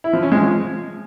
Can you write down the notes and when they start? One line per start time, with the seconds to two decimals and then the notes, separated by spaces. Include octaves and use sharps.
0.04 E4
0.13 F3
0.23 C#4
0.32 G#3
0.41 F3